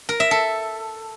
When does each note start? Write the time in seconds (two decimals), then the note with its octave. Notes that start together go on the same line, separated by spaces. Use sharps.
0.09 A#4
0.20 E5
0.31 A4